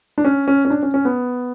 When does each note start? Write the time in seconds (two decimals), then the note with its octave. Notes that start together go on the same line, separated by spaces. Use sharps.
0.18 D4
0.25 C#4
0.48 C#4
0.65 C#4
0.70 D4
0.83 C#4
0.94 C#4
1.05 B3